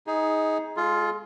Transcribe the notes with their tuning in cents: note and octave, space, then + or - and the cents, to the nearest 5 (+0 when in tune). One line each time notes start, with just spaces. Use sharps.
D#4 +20 G#4 +0
G#3 -20 F4 +0 G#4 +45